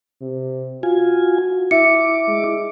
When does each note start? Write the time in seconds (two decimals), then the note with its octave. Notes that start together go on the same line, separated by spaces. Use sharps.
0.21 C3
0.83 F4 F#4 G#5
1.71 E4 E5 D6 C#7
2.28 G#3